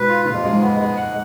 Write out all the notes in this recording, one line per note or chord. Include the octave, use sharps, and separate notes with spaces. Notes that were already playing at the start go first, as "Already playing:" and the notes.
Already playing: G#2 B2 B4
F4
A#2 C#3 F4
F2
F#2 G#3
F2 G#2
B3
F#2 G#3
F#5